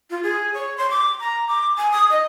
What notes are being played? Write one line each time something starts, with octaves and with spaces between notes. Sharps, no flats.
F4
G#4
C#5
C6
D6
A#5
D6
G#5
D#6
D#5